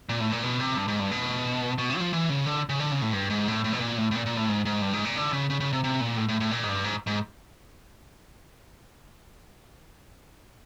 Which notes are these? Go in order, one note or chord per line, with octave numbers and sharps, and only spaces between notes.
A#2
A2
A#2
B2
C3
G2
G#2
G2
B2
B2
C3
F#3
F3
E3
C#3
D3
C#3
D3
C#3
A2
G2
G#2
A2
A2
B2
A#2
A2
A2
A#2
A#2
A2
G#2
G#2
G2
G#2
A#2
D3
C#3
C#3
C#3
C3
C3
A#2
A2
A2
A2
A#2
G#2
G2
G#2
G#2